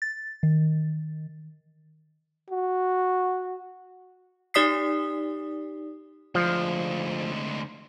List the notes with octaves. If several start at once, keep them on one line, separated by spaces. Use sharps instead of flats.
A6
D#3
F#4
D#4 G4 D5 D#6 B6 C7
D2 F3 G#3